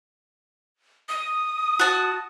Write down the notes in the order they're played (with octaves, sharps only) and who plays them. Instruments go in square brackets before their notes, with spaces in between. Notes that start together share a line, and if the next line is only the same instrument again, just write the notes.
[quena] D#6
[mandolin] F#4 A5